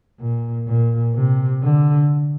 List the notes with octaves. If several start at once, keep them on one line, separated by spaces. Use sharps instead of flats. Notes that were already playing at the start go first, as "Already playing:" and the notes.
A#2
A#2
C3
D3